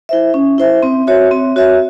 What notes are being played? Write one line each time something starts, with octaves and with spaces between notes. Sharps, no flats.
E4 C5 E5
C#4
E4 C5 E5
C4
F#4 C#5 E5
C4
F#4 C#5 E5